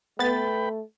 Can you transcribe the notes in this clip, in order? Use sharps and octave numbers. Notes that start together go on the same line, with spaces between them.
A3 B3 B4 G5 B5 A6